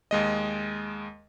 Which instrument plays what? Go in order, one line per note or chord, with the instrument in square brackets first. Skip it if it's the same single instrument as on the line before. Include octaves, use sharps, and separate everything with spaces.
[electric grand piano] D#2 G#3 D#5